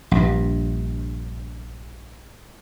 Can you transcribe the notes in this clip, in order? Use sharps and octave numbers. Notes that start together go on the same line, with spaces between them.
A#1 G2